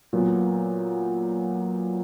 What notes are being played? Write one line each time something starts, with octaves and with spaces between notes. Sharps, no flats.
A#2 F#3 B3